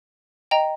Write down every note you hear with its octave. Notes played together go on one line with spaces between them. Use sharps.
D#5 G5 A#5